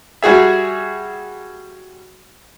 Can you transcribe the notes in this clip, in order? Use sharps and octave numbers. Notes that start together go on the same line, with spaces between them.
G3 F#4 G#4 E5